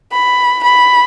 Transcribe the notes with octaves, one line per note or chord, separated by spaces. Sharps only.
B5
B5